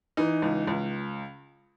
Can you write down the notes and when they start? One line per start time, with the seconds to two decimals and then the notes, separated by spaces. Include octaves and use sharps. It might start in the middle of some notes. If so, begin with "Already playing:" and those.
0.17 E3 D#4
0.42 C#2
0.67 C#2